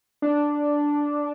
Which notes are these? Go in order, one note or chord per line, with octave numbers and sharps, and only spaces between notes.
D4